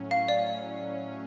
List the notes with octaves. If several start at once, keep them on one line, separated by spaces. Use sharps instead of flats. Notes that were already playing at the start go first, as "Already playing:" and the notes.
Already playing: A2 F#3 C#4
F5
D5